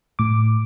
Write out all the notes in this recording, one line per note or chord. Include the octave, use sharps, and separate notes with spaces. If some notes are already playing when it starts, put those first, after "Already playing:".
A2 D6